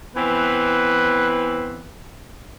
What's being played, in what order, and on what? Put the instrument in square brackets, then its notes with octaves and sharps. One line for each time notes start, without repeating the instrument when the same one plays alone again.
[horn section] E3 B3 C4 B4